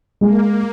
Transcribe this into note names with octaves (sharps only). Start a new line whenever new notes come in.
G#3 A#3